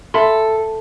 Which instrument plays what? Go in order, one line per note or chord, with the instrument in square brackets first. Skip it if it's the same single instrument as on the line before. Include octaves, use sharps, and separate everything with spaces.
[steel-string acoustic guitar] A4 [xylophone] E5 B5 C6